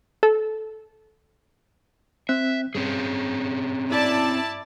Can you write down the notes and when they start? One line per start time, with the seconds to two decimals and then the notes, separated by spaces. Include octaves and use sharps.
0.23 A4
2.29 C4 E5 F#6
2.75 G2 C4 C#4 G#4
3.89 E4 D5 A5